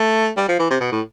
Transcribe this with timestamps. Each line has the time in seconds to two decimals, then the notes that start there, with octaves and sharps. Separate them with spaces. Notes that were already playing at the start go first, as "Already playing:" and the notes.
Already playing: A3
0.37 G3
0.48 F3
0.59 E3
0.70 C3
0.80 B2
0.92 A2